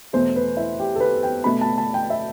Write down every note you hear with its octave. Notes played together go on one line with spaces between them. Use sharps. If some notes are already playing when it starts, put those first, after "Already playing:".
E2 B2 A3 C5
B4
E4
G4
A4
B4
G5
B2 A3 B5
A5
A5
G5
E5